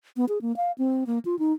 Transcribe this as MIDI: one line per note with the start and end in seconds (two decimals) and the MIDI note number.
0.17 0.25 59
0.29 0.41 68
0.42 0.55 58
0.57 0.72 77
0.78 1.04 60
1.07 1.19 58
1.25 1.38 65
1.39 1.53 63